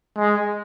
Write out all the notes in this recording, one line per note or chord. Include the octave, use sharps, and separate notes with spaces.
G#3